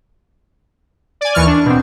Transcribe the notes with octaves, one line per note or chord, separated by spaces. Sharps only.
D5 G#5
D#2 E3 C#6 F6
D4
B2 C4